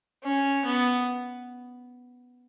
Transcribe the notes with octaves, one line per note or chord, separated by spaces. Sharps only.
C#4
B3